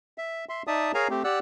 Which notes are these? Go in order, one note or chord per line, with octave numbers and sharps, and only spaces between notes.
E5
E5 C6
D#4 D5 E5 A5 D#6
G#4 A#4 C#5 F5 G#5 A#5
A3 C4 G4
G4 D5 F#5 E6 F#6